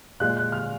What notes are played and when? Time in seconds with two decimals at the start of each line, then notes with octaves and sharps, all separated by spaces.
0.20 A#2 G#3 F#6
0.37 F#6
0.52 F6